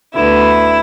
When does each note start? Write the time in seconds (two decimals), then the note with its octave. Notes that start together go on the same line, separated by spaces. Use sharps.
0.14 D2 D3 B3 E4